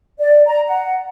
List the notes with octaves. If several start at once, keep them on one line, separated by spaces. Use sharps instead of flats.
D5
A#5
F#5